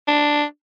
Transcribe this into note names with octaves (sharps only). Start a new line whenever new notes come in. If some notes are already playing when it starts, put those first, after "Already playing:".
D4